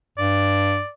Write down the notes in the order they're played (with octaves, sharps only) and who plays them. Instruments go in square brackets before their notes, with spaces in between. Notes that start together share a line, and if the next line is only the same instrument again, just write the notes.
[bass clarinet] G2 [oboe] D5